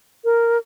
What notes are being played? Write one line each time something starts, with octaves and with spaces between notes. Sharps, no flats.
A#4